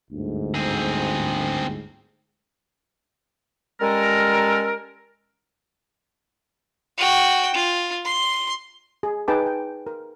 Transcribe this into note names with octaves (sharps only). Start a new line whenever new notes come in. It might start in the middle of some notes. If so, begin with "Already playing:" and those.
G1 D2 G#2
C4 G#4
G3 G#3 C#4 A4 A#4
F#4 G5
F4
C6
G#4
D#4 G#4 B4 G5 A5 D6
G5
A#4